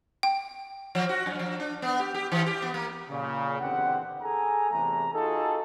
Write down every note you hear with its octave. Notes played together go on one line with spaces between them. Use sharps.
G5
F3
F#4
F#2
F3
D4
B3
G4
G4
E3
G4
B3
A#3
A#2 C#3
E2 D3 C4 G4 F#5
G#4 A4 G#5 A#5
E2 C3 E3 A3 A#5
D#4 F4 F#4 G#4 A4